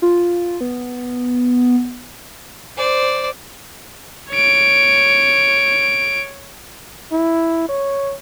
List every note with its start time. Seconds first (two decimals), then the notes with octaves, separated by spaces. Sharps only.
0.02 F4
0.61 B3
2.76 C5 D5
4.30 C#5 D7
7.12 E4
7.69 C#5